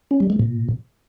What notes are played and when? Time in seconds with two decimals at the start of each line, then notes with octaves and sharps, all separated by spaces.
0.11 C#4
0.20 G3
0.30 G#3
0.39 A#2